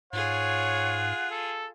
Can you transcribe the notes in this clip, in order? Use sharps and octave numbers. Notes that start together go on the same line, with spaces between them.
G#2 F4 G#4 C#5 F#5
A4